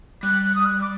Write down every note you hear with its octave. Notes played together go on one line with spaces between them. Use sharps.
G3 F#6
F#6
D#6
F#6
D6